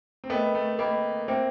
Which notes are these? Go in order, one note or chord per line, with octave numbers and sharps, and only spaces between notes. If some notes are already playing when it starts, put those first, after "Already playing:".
C4
A3 B3 A#4 D#5 G5 B5
A3
A#3 A#4 D#5 G5 B5
A#3 C4 C5 E5 G5